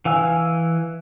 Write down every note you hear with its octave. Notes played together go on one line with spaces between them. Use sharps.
E3 F5 G#5 E6